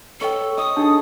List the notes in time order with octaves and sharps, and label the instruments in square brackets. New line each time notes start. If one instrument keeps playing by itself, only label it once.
[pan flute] A4 [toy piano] B4 D#5 G5 [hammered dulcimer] C#5
[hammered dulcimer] D#5 [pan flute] D#6
[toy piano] D4 D#4 [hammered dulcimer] G#4 A4